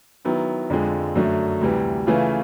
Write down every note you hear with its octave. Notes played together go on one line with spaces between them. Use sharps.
D#3 F#3 B3 E4
F2 D3 F3 G#3
F#2 D3 F#3 A3
D2 C3 E3 G3
C#3 E3 A3 C#4 F4